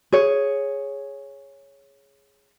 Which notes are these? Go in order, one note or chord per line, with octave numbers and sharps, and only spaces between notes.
G#4 C#5